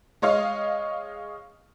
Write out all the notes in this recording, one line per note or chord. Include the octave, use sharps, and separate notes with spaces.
G#3 C#5 D#5 F5